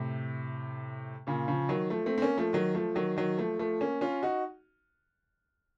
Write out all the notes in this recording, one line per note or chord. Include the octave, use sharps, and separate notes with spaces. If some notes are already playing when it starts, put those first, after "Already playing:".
Already playing: A2 C3
A#2 C#3
C#3 F3
D#3 F#3
F3 A3
A3 C4
C4
A#3 C#4
F3 A3
D#3 F#3
F3 A3
D#3 F#3
D#3 F#3
F3 A3
F3 A3
A#3 C#4
C#4 F4
D#4 F#4